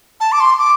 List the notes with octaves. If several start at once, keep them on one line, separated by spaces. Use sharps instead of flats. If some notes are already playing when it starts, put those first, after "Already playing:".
A5
D6
C6
D6